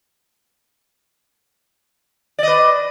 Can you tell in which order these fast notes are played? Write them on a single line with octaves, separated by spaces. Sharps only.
D5 D#5 B4